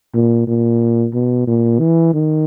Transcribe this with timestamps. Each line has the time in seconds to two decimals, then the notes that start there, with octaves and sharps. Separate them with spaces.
0.14 A#2
0.48 A#2
1.14 B2
1.48 A#2
1.80 E3
2.14 D#3